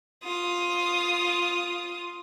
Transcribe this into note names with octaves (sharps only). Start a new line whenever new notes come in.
F4 D#6